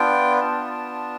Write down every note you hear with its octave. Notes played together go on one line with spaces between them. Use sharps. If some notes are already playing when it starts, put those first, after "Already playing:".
Already playing: B3 D4 F4 G5
A5